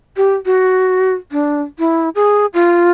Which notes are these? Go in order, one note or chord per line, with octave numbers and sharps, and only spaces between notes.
G4
F#4
D4
E4
G#4
F4